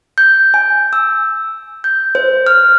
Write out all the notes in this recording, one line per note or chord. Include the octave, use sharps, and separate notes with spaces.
G6
G#5
E6
G6
C5
F6